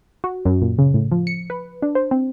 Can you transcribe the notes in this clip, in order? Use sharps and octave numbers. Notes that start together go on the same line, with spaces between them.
F#4
F#2
A#2
C#3
A2
F3
C#7
B4
D4
C5
C4